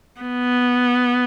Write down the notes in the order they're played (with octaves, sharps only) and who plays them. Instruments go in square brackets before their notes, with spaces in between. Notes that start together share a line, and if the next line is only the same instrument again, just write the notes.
[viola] B3